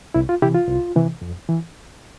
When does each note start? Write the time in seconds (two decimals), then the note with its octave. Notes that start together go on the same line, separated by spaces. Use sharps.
0.14 C2 E4
0.29 F4
0.42 C3 E3 E4 G4
0.55 F4
0.68 C2
0.96 C3 E3
1.22 F2
1.49 E3